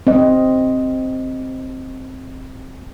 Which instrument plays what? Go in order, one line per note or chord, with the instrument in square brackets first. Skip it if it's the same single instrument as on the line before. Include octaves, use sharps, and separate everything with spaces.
[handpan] C4 D#5